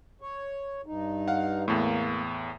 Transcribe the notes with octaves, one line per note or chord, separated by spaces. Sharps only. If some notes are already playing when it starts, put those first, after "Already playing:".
C#5
G2 D#4
F5 F#5
E2 A2 A#3